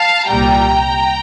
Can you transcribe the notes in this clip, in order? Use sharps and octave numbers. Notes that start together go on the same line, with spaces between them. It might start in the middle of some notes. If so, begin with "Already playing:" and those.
Already playing: F5 A5
C2 A#2 G3 G5 A#5